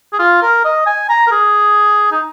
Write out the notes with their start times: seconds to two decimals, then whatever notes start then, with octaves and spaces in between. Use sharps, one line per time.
0.13 G#4
0.19 F4
0.42 A#4
0.65 D#5
0.86 G#5
1.09 A#5
1.27 A#4
1.32 G#4
2.11 D#4